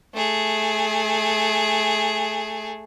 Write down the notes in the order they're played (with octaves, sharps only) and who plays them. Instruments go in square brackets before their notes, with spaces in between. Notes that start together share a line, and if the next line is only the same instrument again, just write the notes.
[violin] A3 G#4